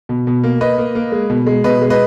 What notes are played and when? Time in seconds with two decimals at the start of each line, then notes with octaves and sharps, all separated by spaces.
0.09 B2
0.27 B2
0.44 A#3
0.61 A#3 B4 D#5
0.78 A#3
0.95 A#3
1.12 G#3
1.30 B2
1.46 G#3
1.64 B2 B4 D#5
1.81 G#3
1.90 B4 D#5